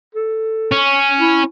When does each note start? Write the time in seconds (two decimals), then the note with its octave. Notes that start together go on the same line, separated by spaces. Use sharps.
0.15 A4
0.72 C#4
1.20 E4